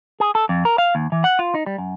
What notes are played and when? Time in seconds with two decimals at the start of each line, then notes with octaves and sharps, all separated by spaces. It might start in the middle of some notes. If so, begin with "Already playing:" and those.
0.20 G#4
0.35 A4
0.49 F2
0.65 A#4
0.78 F5
0.95 D#2
1.12 E3
1.24 F#5
1.39 F4
1.55 D#4
1.66 G3
1.78 F#2